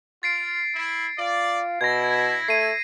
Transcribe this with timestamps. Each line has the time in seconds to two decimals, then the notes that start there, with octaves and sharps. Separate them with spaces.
0.23 F4 A6 C7 D7
0.75 E4
1.19 F4 D5
1.81 B2 E4 G#6 A#6
2.48 A3 C7 D#7